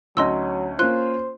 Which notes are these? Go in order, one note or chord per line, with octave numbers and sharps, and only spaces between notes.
D2 F#3 C#4 D#4 D#5 C6 E6
A#3 C#4 F4 C5 C6 F#6